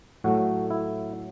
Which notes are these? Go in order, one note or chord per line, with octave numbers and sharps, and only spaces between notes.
A2 F#3 A3 F#4
E4